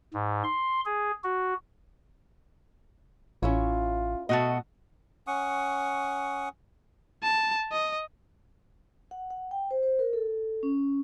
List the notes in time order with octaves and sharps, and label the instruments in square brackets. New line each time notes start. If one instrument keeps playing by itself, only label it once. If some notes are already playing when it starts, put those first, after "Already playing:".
[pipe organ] G#2
C6
G#4
F#4
[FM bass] A1 [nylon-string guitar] C#4 E4 C#5 [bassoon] F4
[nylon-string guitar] B2 [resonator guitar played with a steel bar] A3 F#4 D#5
[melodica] C#4 F#5 C#6 D#6
[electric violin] A5
D#5
[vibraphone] F#5
F#5
G5
C5
C5
A#4
A4
C#4